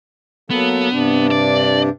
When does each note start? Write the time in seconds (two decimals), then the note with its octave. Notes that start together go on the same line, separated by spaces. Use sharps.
0.50 F#3 A#3 B3 A4
0.91 G2 C3 D4
1.31 D5